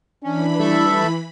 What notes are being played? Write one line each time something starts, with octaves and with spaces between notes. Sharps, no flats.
E3 C#4 D4 B5
G3 A3 E4 A4 E5